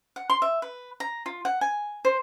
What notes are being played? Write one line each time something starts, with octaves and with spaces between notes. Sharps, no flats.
F#5
C6
E5
B4
A#5
F4
F#5
G#5
C5